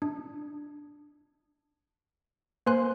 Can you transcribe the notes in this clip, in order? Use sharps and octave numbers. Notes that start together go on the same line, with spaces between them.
D4
A#3 B4 C5 G#5 C6 F#6